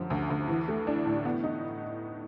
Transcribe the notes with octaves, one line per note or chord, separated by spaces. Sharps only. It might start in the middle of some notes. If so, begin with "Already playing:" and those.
Already playing: F#2 D3 F3
D2
D2
E3
A3
D4
A2
B3
D#4